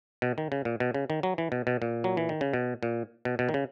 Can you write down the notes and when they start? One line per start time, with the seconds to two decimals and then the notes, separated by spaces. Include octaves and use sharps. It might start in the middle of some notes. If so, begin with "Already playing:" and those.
0.22 B2
0.38 D#3
0.52 C#3
0.65 A#2
0.80 B2
0.94 C#3
1.10 D#3
1.23 F#3
1.38 E3
1.52 B2
1.67 B2
1.82 A#2
2.04 F#3
2.17 E3
2.29 D#3
2.41 C#3
2.54 B2
2.83 A#2
3.25 B2
3.39 B2
3.49 D#3
3.54 C#3